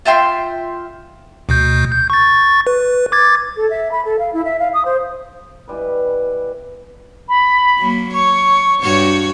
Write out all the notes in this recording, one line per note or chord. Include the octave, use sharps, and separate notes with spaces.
F4 E5 G5 C6
D2 B2 G6
G6
C#6 A6
B4
D6 G#6 A6
A4
E5
B5
A4
F5
E4
E5
F5
D#6
C5
B2 E3 G3 B4
B5
F#3 A#3
C#5 C#6
G2 F#4 C#5